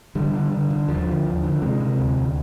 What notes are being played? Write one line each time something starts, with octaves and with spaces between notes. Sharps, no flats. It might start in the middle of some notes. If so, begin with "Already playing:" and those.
D3 G3
D3
D3
D3
D#2 F3
D3
D#2
D3
C3 G#3
C3
D2
D2